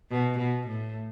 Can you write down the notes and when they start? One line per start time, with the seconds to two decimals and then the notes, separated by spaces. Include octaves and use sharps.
0.11 B2
0.39 B2
0.68 A2